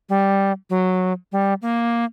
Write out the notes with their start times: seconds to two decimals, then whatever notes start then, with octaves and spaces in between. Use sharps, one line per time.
0.09 G3
0.70 F#3
1.32 G3
1.62 A#3